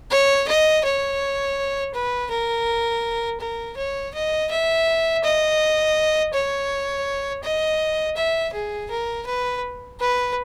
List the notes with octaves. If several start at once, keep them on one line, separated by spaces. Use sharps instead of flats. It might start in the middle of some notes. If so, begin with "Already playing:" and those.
C#5
D#5
C#5
B4
A#4
A#4
C#5
D#5
E5
D#5
C#5
D#5
E5
G#4
A#4
B4
B4